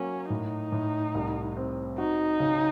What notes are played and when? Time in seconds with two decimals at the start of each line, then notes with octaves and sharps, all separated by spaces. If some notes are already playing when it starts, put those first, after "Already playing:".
Already playing: F#3 A#3 C#4
0.30 A2 D#4
0.72 A2
1.15 C2
1.57 C4
1.98 D#4 F#4
2.40 C#3